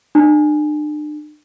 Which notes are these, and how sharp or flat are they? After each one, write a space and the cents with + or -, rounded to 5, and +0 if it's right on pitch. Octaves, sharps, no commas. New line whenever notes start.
D4 +40